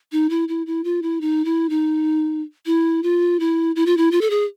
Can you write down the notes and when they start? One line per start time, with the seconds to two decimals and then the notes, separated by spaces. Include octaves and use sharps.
0.12 D#4
0.30 E4
0.48 E4
0.67 E4
0.84 F4
1.02 E4
1.21 D#4
1.45 E4
1.69 D#4
2.66 E4
3.03 F4
3.40 E4
3.76 E4
3.86 F4
3.97 E4
4.11 F4
4.21 A4
4.30 G#4